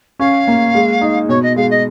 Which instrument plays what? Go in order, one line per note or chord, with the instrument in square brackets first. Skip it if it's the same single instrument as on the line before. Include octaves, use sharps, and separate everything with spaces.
[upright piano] C#4 [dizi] F5
[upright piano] A#3
G#3
D#4
[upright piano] B2 [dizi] C#5
[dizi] D#5
[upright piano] G#3 [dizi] F5
[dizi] D#5